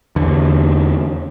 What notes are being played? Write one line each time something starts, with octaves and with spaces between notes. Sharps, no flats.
E2 D3